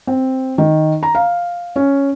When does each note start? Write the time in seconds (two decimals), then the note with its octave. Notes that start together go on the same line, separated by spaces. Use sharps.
0.07 C4
0.58 D#3
1.03 A#5
1.15 F5
1.76 C#4